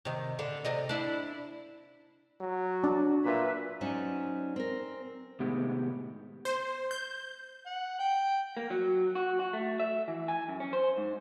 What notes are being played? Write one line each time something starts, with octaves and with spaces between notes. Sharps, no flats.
C3 D#3
D3
C3 D5 D#5
D4 E4
F#3
D4 F#4
A#2 B4 E5
F#3 C#4 D#4 C5 D5
C4 A#4
A2 C3 D#3 G#3 B3 G4
C5
G6
F#5
G5
A#3
F#3
F#4
F#4
A3
E5
E3
G#5
F#2
C#4
C5
G#2